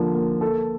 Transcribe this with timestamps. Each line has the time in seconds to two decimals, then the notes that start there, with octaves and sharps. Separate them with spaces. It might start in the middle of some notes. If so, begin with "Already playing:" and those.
Already playing: D3 F3 A#3
0.15 A#3
0.41 A4